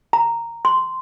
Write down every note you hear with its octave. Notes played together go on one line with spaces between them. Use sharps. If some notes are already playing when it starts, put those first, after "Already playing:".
A#5
C6